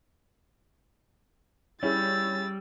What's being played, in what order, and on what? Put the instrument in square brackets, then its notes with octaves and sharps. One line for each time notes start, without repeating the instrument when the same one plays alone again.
[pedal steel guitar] G3 [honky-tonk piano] C#4 E4 G#4 [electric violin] E6 A6